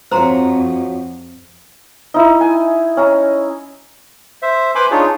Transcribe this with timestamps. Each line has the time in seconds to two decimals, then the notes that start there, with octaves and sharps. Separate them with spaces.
0.11 F2 F4 F#4 C5 C#5 A#5 C6
2.14 D#4 E4
2.41 G#5
2.97 C#4 A#5
4.42 C5 E5
4.75 B4 C5 G#5 B5 C6 D6
4.91 D4 D#4 F4 G#4 C#5